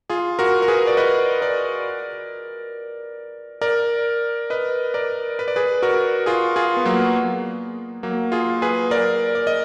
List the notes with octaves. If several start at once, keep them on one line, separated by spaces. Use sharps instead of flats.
F4 G#4
F#4 A#4
A#4
G#4 B4
D5
B4 D#5
A#4 D5
A#4 D5
B4 D#5
A#4 D5
B4
D5
G#4 B4
F#4 A#4
F4 G#4
F4 G#4
B3
F#3 A#3
F#3 A#3
F4 G#4
G#4 B4
A#4 D5
D5
D#5